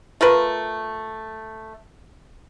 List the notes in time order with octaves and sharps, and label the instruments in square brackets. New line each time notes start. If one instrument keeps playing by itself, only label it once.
[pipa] A3 F4 A#4 B4